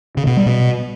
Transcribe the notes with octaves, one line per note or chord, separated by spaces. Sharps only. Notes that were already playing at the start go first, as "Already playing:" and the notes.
C#3
B2
G3
B2